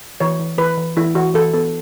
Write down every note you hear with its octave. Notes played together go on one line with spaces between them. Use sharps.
E3 C#5
E3
E3 B4
E3
E3 E4
E3 F#4
E3 A4
B3 A4